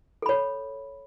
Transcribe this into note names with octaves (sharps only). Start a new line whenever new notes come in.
A4 C#5 B5